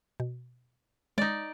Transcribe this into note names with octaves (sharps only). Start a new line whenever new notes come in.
B2
G#3 D#4 D5